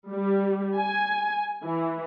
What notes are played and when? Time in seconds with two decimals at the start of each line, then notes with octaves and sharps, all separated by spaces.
0.11 G3
0.78 G#5
1.65 E3